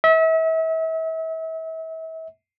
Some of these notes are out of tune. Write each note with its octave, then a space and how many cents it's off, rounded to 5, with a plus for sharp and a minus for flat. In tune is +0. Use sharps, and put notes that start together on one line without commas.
E5 -35